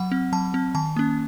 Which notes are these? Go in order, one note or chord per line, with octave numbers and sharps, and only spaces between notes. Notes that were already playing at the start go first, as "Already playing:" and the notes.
Already playing: F#3 F#5
C4
F#3 A5
C4
D#3 A5
A#3 C#4